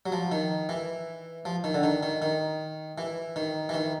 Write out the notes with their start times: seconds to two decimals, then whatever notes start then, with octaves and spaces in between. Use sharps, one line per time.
0.06 F#3
0.12 F3
0.32 D#3
0.69 E3
1.45 F3
1.64 D#3
1.74 D3
1.83 D#3
2.03 D#3
2.22 D#3
2.98 E3
3.36 D#3
3.69 E3
3.74 D#3